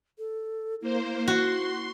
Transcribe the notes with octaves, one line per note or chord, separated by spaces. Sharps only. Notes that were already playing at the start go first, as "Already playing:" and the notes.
A4
A#3 E4 C5
F#4 C6